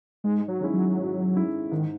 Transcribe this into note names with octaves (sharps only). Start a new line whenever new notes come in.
G#2 G#3
F#3
D#3 G#3 C#4 E4
F#3
G#2
D#3 G#3 C#4 E4
G#2 D#3